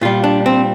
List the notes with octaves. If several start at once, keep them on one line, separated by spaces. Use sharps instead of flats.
A#2 G3 F4
D4
C4